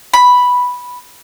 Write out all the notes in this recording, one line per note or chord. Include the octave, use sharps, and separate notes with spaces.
B5